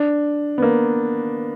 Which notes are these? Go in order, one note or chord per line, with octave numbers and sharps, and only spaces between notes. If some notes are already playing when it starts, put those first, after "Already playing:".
Already playing: D4
B3
A#3